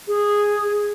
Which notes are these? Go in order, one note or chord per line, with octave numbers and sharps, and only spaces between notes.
G#4